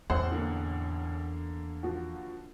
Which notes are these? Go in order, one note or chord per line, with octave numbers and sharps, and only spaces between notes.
A1 E2 C5 F#5
D3 A#3
F3 F#4